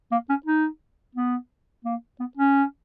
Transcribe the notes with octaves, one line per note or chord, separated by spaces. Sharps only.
A#3
C#4
D#4
B3
A#3
B3
C#4